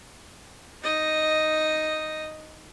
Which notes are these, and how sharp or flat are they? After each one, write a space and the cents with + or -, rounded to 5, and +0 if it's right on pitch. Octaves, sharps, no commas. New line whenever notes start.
D#4 +0 D#5 +0